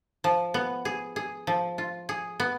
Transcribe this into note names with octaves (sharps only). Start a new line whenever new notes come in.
F3
B3
G#4
G#4
F3
F4
G#4
B3